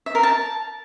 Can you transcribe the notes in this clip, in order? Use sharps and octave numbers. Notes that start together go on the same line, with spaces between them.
E5
A#4
A5